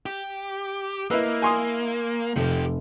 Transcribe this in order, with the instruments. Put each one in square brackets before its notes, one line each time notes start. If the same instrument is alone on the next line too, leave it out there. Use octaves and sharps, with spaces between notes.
[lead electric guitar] G4
[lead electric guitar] A#3 [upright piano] E4 D#5 E6 [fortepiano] B4
[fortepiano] G#5 C6 D#6
[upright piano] F1 A4 [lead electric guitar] F3 G4